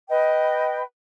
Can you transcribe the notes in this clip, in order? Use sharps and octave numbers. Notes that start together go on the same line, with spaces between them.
B4 D#5 G5